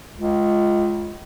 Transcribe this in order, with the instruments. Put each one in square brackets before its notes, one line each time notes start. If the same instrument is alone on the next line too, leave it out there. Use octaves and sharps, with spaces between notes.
[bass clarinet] C#2